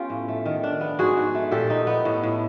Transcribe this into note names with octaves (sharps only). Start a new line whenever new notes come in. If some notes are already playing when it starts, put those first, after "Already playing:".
Already playing: B3 C#4 F4 G4
A2
A3
D#3
D4
B3
G#2 F#4 G#4
G#2
A3
A#2 G4 A4
D#4
B3
A2
A2